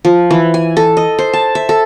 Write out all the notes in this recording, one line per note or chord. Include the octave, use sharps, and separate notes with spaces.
F3
E3
G#5
A4
D#5
C5
A5
E5
A4